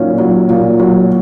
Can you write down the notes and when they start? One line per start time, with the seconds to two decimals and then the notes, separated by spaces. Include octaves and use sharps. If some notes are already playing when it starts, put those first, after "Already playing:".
Already playing: A#2 F#3 C#4 D#4
0.18 F#3
0.49 A#2
0.80 F#3